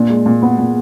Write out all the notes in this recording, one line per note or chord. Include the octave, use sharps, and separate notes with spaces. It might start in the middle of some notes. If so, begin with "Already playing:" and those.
Already playing: A#2 D4
G#3
A#2
B3
A#2